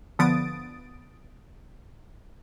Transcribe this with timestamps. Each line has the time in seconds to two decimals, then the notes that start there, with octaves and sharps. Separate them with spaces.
0.19 D3 F3 B3 D#6 A6 D7